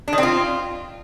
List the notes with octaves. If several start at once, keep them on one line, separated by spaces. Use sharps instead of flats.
D4
D#3
C4
F4